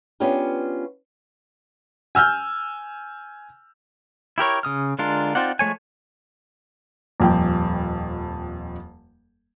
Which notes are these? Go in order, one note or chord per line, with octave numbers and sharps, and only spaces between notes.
B3 C#4 D4 F4 G4
G#5 E6 F6 G6
E4 G4 A#4 C#5
C#3 D#6 F6
D3 G#3 D4 F4 A#4
C4 D#4 F4 D5 F#5
F3 G#3 A3 C#5 G#5
D#1 F2 G5